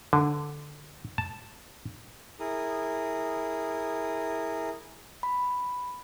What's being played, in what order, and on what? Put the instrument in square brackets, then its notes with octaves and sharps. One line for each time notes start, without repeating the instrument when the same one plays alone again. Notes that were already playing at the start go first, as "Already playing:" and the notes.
[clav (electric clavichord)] D3
A5
[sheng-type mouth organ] E4 G#4 A#4 D#6
[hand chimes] B5